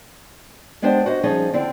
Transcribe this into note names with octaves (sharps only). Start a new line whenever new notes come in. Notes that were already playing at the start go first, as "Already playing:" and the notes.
G#3 B3 D4 G4 C5 D5
F#4 C5 D#5
F3 G3 C#4 D#4 G#4 D#5
D3 C4 E4